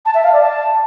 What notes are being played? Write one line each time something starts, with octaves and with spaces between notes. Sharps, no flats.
A5
E5
F5
D5
A5